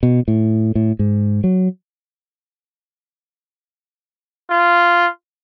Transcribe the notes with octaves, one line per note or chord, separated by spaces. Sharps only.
B2
A2
A2
G#2
F#3
F4